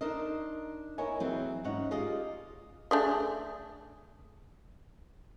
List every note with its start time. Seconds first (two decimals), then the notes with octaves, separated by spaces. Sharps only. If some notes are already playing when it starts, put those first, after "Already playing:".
0.01 D4 D#4 A#4 C5 D#5
0.98 B3 E4 A#4 C#5 D#5 G#5
1.20 E3 F#3 C4 G#4
1.64 G#2 C#4 D#5 F#5
1.91 F4 G4 G#4 D5 D#5
2.91 A3 D4 G#4